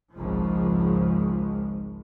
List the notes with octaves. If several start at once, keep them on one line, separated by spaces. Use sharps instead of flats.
G#1 C#2 F3 G#3